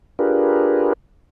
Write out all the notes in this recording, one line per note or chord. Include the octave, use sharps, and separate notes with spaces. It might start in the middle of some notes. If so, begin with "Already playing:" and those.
D4 F4 G4 G#4 A#4 B4